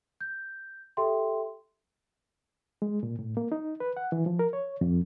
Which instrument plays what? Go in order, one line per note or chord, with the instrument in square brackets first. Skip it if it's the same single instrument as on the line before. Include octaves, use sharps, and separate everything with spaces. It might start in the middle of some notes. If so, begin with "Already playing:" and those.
[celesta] G6
G4 A4 E5 G5 C6
[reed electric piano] G#3
A#2
A2
A#3
D#4
B4
F#5
E3
F3
A#4
C#5
F2